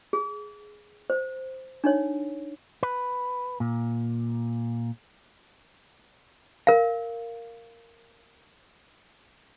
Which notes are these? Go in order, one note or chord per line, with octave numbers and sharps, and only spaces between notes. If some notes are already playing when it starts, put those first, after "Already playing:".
G#4
C5
D4 D#4 C#5
B4
A#2
A#4 F5